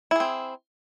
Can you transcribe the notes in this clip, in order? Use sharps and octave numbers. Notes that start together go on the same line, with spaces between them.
C4 E4 G#4